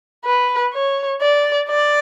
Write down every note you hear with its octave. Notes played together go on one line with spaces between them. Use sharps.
B4
C#5
D5
D5